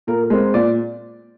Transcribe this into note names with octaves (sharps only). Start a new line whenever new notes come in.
A#2 A#4
A#4
G#3 C4
A#2 D5